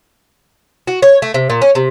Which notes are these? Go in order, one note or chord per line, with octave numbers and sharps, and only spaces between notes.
F#4
C#5
A3
C3
A#2
C#4
C3